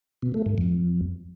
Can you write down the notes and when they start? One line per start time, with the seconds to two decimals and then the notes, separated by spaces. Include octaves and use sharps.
0.22 B2
0.34 A3
0.46 G#2
0.58 F2